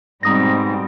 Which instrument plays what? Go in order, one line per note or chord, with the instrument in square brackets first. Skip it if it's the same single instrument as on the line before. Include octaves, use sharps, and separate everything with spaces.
[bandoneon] G#2 [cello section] B2 G3 C4 [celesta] A#5 D#6 A#6